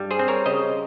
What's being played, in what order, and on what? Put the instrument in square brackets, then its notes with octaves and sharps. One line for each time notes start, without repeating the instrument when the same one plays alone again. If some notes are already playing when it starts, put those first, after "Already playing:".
Already playing: [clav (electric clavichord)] G2 G3
G#4 C5
C4
A#4 C#5
C#3 C5 D#5